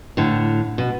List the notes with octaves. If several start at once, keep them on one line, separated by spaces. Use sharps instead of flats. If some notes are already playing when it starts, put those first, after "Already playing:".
A2 D3
B2